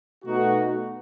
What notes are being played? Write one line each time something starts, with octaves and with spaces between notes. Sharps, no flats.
B2 A3 D#4 F#4